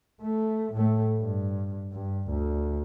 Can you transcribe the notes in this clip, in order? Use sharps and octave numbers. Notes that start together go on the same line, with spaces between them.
A3
A2 A3
G2
G2
D2